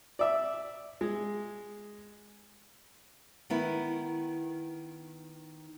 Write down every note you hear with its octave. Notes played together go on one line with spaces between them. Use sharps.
D5 E5
G#3
D#3 B3 E4